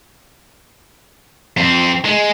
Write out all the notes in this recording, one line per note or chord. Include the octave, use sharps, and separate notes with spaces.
F2 C4
G#3